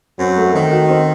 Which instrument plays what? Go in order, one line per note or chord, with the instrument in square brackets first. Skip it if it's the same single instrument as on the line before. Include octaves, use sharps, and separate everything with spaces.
[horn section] F#2 F#3 [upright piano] C4
[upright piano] A3
[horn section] D#3 [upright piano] C4
[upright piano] F#4
C4